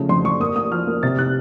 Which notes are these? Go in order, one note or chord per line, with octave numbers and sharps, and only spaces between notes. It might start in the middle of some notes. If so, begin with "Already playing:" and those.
Already playing: C#3 F3 A3
F2 C6
F2 C#6
A#3 D#6
A#3 D#6
F3 F6
A#3
C3 A6
C3 F#6